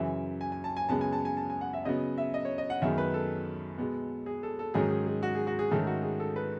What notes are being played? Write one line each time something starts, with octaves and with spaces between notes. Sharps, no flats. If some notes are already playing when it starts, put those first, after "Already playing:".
Already playing: F#2 C#3 E3 E5
G#5
G#5
A5
G#5
F#2 C#3 G#3 B3 A5
G#5
A5
G#5
A5
G#5
F#5
E5
C#3 F#3 B3 D#5
E5
D#5
C#5
D#5
F#5
F#2 D#3 G#3 B3 E5
B4
A4
B2 G#3 B3
G#4
A4
A4
G#2 D#3 F#3 C#4 G#4
G#4
G#4
F#4
G#4
F#4
G#4
G#2 D#3 A3 C#4 A4
F#4
G#4
A4
B4